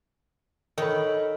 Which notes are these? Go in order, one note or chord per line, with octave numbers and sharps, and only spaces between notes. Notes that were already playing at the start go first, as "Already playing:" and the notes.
D#3 D#4 A4 C#5 B5